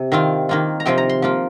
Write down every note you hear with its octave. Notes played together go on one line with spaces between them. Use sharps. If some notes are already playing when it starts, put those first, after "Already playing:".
Already playing: C3
D#3 C4 F4 F5
D#3 A#3 F4
A#5
C3 F3 C4 F4 G5
A#5
C6
F3 A#3 F4